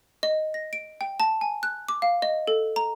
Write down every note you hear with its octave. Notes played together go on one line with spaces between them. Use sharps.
D#5
A#6
D7
G5
A5
G#5
F#6
D6
F5
D#5
A4
A#5